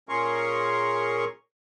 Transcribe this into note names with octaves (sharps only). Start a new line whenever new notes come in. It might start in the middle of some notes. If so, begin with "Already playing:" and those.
A#2 C#4 G#4 A#4 C6 C#6